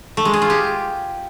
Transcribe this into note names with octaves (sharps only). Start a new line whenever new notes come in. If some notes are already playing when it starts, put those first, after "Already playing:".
A3
G#3
G#4
F4
G4